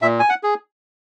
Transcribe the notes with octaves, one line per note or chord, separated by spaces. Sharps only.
A#2 E5
G#5
F#5
G#4